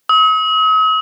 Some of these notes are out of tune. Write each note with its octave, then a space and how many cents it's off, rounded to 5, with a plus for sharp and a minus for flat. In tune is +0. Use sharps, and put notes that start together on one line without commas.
D#6 +45